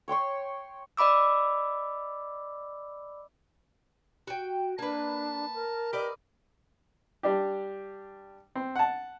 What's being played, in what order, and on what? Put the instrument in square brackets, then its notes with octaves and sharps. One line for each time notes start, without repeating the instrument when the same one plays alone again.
[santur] C#5 G5 C6 C#6
[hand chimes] D5 D#5 B5 D6 E6
[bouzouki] F#4 G5
[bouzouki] A#3 B4 [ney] D4 [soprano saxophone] A5
[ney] A#4
[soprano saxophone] G4 [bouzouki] B4 D5 D#5
[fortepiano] G3 D4 G4
C4
F#5 A5